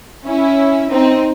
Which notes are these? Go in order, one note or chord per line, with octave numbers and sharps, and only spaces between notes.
C#4 E4
C4 D#4